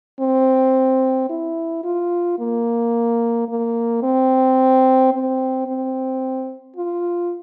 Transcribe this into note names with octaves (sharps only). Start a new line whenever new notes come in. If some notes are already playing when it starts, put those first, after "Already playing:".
C4
E4
F4
A#3
A#3
C4
C4
C4
F4